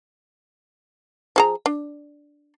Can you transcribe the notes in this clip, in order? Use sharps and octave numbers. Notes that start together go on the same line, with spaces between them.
F3 G#4 A#5
D4